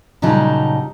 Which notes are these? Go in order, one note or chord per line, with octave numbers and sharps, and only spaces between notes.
A#2 C#3 F#3 G3 D#4 A5